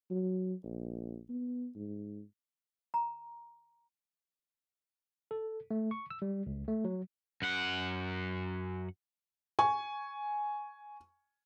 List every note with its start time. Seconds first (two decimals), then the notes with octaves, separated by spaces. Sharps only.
0.11 F#3
0.64 A#1
1.29 B3
1.75 G#2
2.94 A#5
5.31 A4
5.71 A3
5.91 C#6
6.10 E6
6.22 G3
6.46 C#2
6.68 A3
6.85 F#3
7.42 F#2 F#5
9.59 G#5 C#6